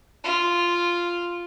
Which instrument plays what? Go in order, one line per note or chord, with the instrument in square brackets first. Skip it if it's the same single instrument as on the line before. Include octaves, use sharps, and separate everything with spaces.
[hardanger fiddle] F4